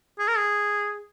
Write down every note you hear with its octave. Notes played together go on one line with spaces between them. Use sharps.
G#4
A#4
G#4